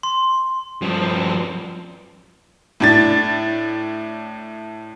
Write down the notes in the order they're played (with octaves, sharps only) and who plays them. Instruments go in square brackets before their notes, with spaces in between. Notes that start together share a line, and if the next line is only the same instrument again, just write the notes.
[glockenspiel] C6
[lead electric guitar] G2 F3
[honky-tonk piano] A2 D4 A6